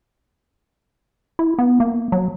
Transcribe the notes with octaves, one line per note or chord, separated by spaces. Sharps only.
E4
B3
A#3
F#3